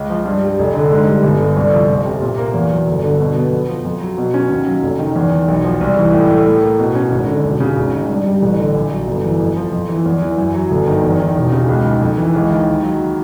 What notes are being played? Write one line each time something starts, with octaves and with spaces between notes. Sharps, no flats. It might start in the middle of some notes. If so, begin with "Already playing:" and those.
Already playing: C#2
F3
G2
G3
F1
D3
G#2
G3
G1
D3
C2
F3
F1
C3
A#2
A#3
E2
F#3
G1
D3
B2
B3
F2
F3
F2
F#3
B2
C#4
D#2
F#3
F1
D#3
E2
D#3
B1
F3
C2
E3
A2
A3
A2
A#3
B2
C#4
G#1
D3
E1
C#3
G#1
D#3
G2
G3
A1
D3
A#1
F#3
G1
E3
F2
F3
F2
E3
E2
E3
F#2
F#3
G1
D#3
E2
D#3
E1
C#3
C#2
D#3
F2
E3
C#2
D#3
D#2
F#3